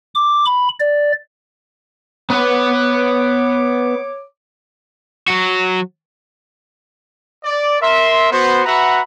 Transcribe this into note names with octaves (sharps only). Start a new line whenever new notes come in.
D6
B5
D5
B3 B4 C#5 D6
F#3 F#4
D5
A#4 E5 C6
B3 F#4 C5
F#4 B4 E5 F#5 A#5 B5